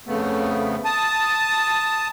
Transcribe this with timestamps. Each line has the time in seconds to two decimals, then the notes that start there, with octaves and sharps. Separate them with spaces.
0.06 F2 C#3 A3 B3
0.85 A5 D#6